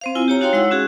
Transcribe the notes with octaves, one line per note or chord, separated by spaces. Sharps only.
C4 C5 F5
E4 F4 G#5
G4 C#5 A#5
D#4 F#4 C#5 F5 G5 C6
G#3 E4 F#5 E6
C#4 F#4 G#4